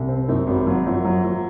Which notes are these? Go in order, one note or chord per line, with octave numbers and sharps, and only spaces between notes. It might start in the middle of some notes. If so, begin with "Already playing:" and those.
Already playing: C2
C4
F#2 D#3
G#1 F#3
F3 F#3
F#2 F3
F#3
F#3